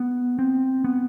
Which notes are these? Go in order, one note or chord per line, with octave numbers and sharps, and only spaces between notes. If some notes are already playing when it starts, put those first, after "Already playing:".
Already playing: B3
C4
B3